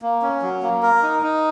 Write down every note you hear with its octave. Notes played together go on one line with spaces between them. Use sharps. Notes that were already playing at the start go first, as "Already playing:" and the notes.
A#3
C#4
F#3
A#3
A#4
D#4
D#4